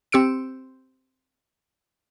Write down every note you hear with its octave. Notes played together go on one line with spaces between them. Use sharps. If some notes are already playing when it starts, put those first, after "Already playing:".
C4 G4 E6 C#7 D7